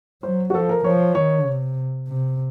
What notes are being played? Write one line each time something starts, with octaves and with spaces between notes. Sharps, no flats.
F#3 C5
F#4
F3 A4
A#4
F3 C#5
D#3 C#5
C3
C3